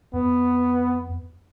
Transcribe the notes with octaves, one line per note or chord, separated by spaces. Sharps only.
F2 B3